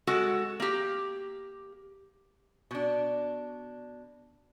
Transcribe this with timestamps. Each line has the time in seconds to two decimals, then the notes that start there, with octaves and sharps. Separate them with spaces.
0.07 G#3 F#4 A4 F#5
0.60 A#3 G4
2.71 B2 D4